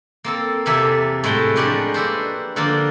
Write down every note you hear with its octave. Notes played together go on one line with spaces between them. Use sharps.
A#3 C4 A4
E2 C3 A#3 A4 E5 G#5
A2 G#3 F#5 G5 A5
F3 G#3 A3 D4 G4 A#4
A#3 D4 A4 B4 C5
D3 F3 A#3 D4 F4